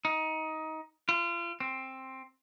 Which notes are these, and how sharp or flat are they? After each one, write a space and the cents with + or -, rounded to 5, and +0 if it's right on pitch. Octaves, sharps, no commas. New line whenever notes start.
D#4 +20
F4 -35
C4 +10